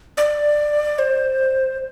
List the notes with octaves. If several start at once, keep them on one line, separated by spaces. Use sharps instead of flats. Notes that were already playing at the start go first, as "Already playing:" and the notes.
D5
C5